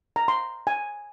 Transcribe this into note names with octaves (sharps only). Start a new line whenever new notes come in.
A#5
C6
G#5